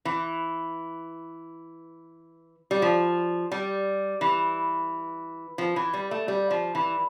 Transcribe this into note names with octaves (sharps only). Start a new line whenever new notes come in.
E3
G3
F3
G3
E3
F3
E3
G3
A3
G3
F3
E3